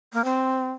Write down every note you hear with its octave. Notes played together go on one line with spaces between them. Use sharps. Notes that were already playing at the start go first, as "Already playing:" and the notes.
A#3
C4